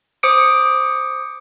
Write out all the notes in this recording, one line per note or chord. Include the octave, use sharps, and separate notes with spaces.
C5 D6 D#6 C#7 D7